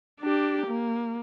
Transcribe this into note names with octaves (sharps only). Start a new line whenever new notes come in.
D4 G4
A#3